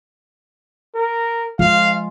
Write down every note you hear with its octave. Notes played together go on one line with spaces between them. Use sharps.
A#4
F3 G#3 F4 F5